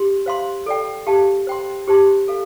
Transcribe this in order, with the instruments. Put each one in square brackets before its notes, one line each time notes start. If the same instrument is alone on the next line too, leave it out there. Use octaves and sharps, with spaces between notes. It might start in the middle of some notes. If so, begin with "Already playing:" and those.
Already playing: [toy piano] G4 C6
C5 F5 C6
A4 D5 G5
G4 F5 A5
C5 G5 C6
G4 C5 A5 C6
A4 F5